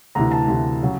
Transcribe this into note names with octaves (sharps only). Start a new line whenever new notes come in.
D2 C3 E3 A#5
A5
D2 C3 E3
C#3 F#3